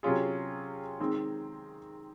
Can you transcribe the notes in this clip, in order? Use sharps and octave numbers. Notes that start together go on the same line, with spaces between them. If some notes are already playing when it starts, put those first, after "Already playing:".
C3 F#3 C#4 F4 G#4
D#3 G#3 C4